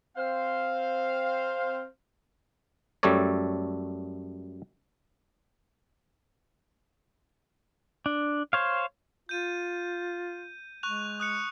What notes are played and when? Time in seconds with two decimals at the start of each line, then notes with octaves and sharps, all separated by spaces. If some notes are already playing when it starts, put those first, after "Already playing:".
0.15 C4 C5 F5
3.03 F#2 G3 A3 A4 C#5 D5
8.06 D4
8.53 C5 C#5 F5
9.29 F4 G6 D#7
10.83 G#3 C#6 F#6 F7
11.20 D#6 F#6 C#7